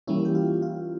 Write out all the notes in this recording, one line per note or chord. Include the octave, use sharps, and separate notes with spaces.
E3 G3 A#3 C#4 E4
G4
F4
F4